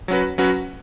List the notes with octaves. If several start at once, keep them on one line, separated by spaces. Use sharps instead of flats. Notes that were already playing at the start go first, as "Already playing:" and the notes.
F#3 C#4 F#4 B4
F#3 C#4 F#4 B4